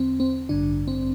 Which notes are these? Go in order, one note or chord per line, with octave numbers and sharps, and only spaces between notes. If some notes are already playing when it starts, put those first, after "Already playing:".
Already playing: E2 D3 C4
C4
A1 G2 D3 D4
C4